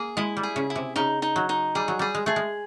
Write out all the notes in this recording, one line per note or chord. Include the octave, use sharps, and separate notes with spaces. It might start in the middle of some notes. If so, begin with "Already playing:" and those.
Already playing: A#3 G#4
G#3 E4
G3
G#4
C#3
E4
C3
C#3 D#4
D#4
F#3
D#4
G3 G#4
F#3
G3 G#4
G#3
A3 G#4
G#3